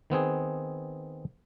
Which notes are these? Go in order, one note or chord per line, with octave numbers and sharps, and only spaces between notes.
D#3 B3 C4 G#4